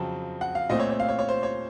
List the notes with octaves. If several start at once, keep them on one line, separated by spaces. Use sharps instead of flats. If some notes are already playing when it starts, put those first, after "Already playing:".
Already playing: F2 C#3 F#3 C4 A5
F#5
F5
A#2 A3 C4 D#5
C#5
C#5
F5
C#5
C#5
C5
C#5